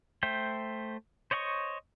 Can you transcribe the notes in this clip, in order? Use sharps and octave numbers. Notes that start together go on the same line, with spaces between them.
A3 C5 E5 G5
C5 C#5 D#5 F#5 C#6